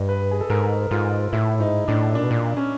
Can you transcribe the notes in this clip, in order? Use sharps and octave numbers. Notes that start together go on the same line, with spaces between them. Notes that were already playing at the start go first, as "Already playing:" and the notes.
Already playing: G2 D#5
B4
G#4
A4
G#2 A#4
G#2 F4
A2 E4
G#2 D#4
A2 D4
A#2 D4
B2
A#2
C#4